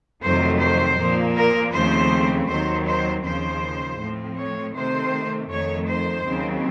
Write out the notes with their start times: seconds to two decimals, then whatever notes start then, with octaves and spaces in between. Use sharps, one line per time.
0.22 F2 C3 D#3 F#3 A3 C5
0.59 C5
0.97 A#2 F3 A#3
1.36 A#4
1.73 D#2 C#3 F3 A3 C4 C5
2.49 D#2 D#3 F#3 C4 C5
2.86 C5
3.24 D#2 C#3 F3 C5
3.99 A2 F3 C4
4.38 C#5
4.75 C3 D#3 A3 C4 C5
5.50 F2 D#3 A3 C#5
5.88 C5
6.25 D#2 C#3 F#3 C4